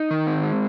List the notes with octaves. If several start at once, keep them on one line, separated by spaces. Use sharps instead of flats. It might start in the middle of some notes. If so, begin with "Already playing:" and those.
Already playing: D#4
D#3
C4
G#3